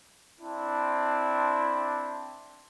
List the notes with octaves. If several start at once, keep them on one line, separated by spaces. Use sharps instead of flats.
C4 D4 E4